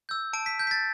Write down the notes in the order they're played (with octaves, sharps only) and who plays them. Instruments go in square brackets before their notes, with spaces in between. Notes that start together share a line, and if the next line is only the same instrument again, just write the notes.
[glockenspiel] E6 G6
A5 D7
B6
G6
B6
A6